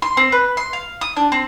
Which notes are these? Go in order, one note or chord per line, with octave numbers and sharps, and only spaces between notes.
C6
C4
B4
C6
F5
D#6
D4
C4